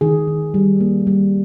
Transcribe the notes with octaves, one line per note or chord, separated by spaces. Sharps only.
D#3 G#4
D#3
G3
A#3
G3